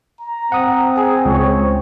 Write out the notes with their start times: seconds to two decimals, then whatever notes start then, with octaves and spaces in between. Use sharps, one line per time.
0.20 A#5
0.52 C4 F#5 D#6
0.96 G#4
1.25 C#2 C#5